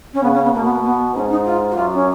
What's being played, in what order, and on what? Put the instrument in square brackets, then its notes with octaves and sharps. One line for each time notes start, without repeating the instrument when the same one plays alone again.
[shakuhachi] C#4
[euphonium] C#3 [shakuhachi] B3
[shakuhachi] C#4
B3
[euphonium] B2 [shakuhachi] A#3
[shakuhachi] B3
A#3
B3
[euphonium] G#2 [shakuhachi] C#4
[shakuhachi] D#4
F4
F#4
[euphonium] F#2 [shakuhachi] F4
[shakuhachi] C#4